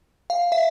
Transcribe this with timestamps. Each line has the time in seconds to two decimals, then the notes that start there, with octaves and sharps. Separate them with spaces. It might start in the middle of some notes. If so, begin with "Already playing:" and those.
0.30 F5
0.52 E5